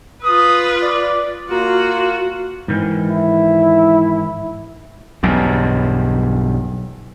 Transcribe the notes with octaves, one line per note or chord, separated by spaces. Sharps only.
F4 B4 D#6
D5
A#3 F4 F#4
G#2 D#3 E3
E4
B1 E2 G2